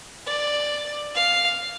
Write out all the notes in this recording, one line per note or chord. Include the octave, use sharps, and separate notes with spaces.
D5
F5